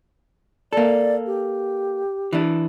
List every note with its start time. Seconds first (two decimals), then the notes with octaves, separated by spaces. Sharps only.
0.73 A#3 A4 D5
1.26 G4
2.33 E3 D4